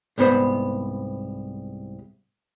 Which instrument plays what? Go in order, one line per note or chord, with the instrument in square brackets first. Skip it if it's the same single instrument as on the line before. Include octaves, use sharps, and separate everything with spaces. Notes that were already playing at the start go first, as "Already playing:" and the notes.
[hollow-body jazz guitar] C2 G#2 B3 C5 B5